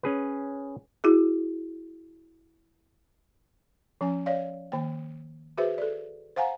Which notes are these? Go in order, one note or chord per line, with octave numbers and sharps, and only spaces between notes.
C#4 G#4 B4
E4 F#4 G#4
F3 C#4 G#5
C#5 D5 F5
D#3 A#3 G5
F#4 G#4 B4 C5 E5
A4 D5
C5 F5 F#5 G#5 A#5